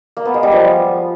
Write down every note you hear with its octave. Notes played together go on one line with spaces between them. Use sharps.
A#3
B3
G#3
G3
F3